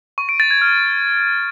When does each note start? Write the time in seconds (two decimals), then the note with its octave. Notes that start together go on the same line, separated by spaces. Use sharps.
0.18 C#6
0.29 D7
0.40 A6
0.51 G#6
0.62 F6